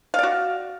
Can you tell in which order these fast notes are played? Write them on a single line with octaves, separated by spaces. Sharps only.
F5 D5 F#4